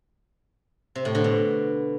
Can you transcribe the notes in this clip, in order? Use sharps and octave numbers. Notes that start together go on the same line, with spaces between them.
C3
A2
D3
B2